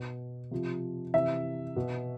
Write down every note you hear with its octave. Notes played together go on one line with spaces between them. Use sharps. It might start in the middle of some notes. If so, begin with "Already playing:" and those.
Already playing: B2
C3 F3
C3 E3 E5
B2